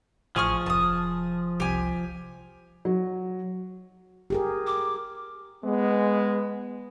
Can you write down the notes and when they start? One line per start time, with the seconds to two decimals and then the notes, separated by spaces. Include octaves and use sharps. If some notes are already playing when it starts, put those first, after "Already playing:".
0.36 A1 F3 G#4 G#5 C#6 F6
0.66 F1 A5 D#6
1.60 C2 G4 G#5
2.85 F#3
4.30 G4 G#4 A#4
4.67 D6
5.65 G#3 B3